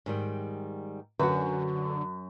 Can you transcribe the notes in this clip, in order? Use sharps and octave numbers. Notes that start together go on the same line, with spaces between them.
G#2 D#3 G3
F#2 D3 F#4 B4